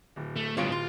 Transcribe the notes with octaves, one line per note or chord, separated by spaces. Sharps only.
D1
A3
D1 G2 B3 C#4 F4 C#5 D7
F4 C6